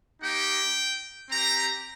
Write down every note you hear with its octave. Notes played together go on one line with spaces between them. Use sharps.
A#3 D#4 G4 G5
C4 G4 A#5